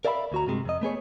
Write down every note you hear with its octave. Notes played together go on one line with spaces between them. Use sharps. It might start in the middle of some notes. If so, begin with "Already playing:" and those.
A#4 D5 E5 F5 A#5 B5
D2 F#4 A#5
G2 C3 G#3
F2 D#5
A3 B3 G#4 C#5